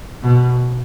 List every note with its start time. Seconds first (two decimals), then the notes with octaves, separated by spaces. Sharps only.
0.23 B2